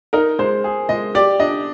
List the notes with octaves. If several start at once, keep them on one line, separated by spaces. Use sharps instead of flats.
D#4 A#4
G#3 C5
G#4
G#3 D#5
G4 D5
D4 D#5